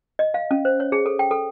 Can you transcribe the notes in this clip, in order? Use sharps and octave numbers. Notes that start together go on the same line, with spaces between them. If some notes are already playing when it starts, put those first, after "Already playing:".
D#5
F5
C#4
C5
C#5
G#4
A4
G5
A4